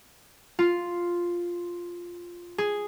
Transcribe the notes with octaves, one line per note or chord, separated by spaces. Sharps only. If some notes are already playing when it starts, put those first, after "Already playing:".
F4
G#4